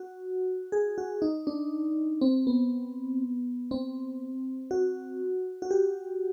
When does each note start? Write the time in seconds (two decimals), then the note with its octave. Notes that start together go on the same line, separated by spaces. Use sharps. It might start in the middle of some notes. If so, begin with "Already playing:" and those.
Already playing: F#4
0.72 G#4
0.98 F#4
1.22 D#4
1.47 D4
2.21 C4
2.47 B3
3.71 C4
4.71 F#4
5.62 F#4
5.71 G4